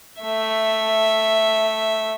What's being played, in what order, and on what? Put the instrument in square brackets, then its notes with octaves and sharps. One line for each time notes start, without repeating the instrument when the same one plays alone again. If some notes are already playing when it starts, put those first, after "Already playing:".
[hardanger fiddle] A3 E5